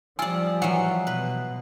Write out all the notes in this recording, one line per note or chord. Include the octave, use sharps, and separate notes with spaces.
F3 G3 F4 D5 G#5 E6
E3 F#3 F#5
B2 B4